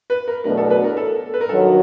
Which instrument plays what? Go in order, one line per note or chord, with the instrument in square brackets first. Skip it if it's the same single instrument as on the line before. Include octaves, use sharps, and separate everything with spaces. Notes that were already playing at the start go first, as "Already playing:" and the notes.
[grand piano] B4
A#4
[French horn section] E2 B2 F#3 A3 D4 [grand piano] A#4
[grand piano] A4
B4
A#4
A4
B4
A#4
[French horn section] G2 D#3 F#3 [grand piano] A4